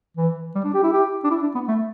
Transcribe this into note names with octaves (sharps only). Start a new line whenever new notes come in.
E3
G3
D4
G4
E4
G4
D4
E4
D4
B3
A3